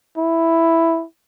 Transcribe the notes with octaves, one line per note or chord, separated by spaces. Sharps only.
E4